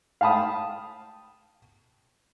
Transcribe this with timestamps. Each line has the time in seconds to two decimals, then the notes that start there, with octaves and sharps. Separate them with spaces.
0.21 F5 G5 A5 B5 D#6